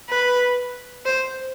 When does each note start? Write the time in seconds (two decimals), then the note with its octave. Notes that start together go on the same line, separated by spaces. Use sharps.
0.10 B4
1.05 C5